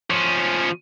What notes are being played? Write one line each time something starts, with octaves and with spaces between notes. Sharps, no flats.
F3 C#4